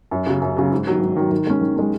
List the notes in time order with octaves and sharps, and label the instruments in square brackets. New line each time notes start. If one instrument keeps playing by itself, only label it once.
[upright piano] F#2
C#3 F#3
F#2
C#3 F#3
G#2
D#3 F#3
G#2
D#3 F#3
D#3
G#3 C#4
D#3
G#3 C#4